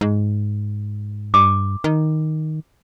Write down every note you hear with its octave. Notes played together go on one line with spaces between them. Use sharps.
G#2
G2 D6
D#3